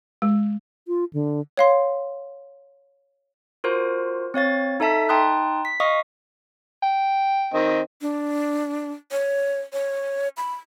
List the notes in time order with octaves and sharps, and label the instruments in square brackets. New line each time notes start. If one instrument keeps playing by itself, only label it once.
[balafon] G#3
[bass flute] F4
D3
[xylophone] C#5 F5 C6
[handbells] F4 F#4 A#4 C5
C4 C#5 F5 A6
D#4 A4 E5 A5 B6
D#4 G5 A5 C6 D#6 F#6
B6
D#5 F5 C#6 D#6
[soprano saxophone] G5
[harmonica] D#3 C4 D#5
[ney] D4
C#5
C#5
B5